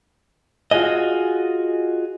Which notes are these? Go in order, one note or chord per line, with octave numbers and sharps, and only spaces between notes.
F4 F#4 G#4 D#5